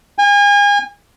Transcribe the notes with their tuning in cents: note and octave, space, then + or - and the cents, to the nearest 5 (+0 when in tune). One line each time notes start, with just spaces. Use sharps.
G#5 -35